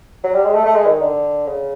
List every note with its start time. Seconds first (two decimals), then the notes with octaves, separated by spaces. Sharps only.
0.24 F#3
0.35 G3
0.45 G#3
0.55 A3
0.65 A3
0.75 G#3
0.86 D#3
1.01 D3
1.47 C#3